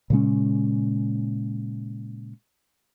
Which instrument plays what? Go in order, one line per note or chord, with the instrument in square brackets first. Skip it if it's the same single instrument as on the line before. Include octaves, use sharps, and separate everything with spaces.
[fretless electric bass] A#2 C#3 G#3 C#4